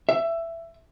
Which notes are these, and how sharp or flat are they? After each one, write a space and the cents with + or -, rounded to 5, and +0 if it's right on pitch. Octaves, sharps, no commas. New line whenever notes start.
E5 +15